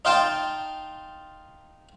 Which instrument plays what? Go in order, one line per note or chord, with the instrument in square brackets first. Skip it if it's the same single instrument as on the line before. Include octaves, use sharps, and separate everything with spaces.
[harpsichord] D#4 F4 G5 A5